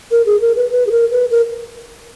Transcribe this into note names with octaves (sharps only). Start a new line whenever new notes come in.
A#4
G#4
A#4
B4
B4
G#4
A#4
B4
A#4